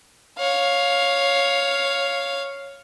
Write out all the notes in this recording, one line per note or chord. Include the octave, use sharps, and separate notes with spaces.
C#5 F5